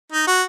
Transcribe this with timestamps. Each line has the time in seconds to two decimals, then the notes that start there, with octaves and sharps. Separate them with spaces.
0.12 D#4
0.27 F#4